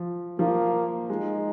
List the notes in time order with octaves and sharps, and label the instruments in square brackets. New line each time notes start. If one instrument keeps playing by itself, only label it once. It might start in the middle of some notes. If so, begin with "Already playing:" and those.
Already playing: [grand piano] F3
[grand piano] F3 [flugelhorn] A#3
[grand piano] G#3 [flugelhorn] D#4